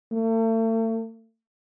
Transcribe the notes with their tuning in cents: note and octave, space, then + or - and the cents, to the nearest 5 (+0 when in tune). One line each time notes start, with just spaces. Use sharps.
A3 +40